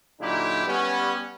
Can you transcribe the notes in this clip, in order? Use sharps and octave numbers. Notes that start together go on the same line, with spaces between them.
A#2 D3 F#3 D#4 E4 G4
G3 B3 C#4